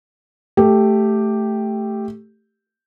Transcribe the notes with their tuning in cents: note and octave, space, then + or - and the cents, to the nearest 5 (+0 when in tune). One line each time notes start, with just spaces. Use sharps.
A3 +0 G4 +0